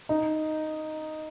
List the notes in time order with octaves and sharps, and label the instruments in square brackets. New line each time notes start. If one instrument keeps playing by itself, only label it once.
[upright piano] D#4